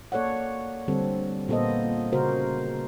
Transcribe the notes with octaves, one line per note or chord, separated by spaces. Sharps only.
A#3 A4 C#5 D5 F#5
D3 G3 C4 A4
A#2 A#3 B3 A4 C5 D#5
C#3 F#4 A#4 C5